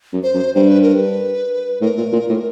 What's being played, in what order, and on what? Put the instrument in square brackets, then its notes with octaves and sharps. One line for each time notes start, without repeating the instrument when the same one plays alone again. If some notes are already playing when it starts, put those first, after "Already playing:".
[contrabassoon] F#2
[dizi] C5
[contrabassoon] F#2
[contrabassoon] G2 [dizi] C5
[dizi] B4
A#4
B4
[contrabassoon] A2 [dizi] A#4
[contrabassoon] A#2
A#2
A2